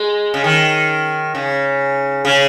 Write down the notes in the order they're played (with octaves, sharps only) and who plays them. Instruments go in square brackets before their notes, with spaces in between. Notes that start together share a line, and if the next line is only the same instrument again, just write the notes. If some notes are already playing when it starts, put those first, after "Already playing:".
Already playing: [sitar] G#3
C#3
D#3
C#3
C#3